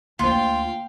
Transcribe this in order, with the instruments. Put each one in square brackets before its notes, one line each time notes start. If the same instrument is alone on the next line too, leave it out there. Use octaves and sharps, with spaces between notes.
[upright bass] D2 D4 [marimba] A#3 C5 [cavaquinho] F4 [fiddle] F5 G5